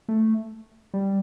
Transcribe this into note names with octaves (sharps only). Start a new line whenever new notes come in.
A3
G3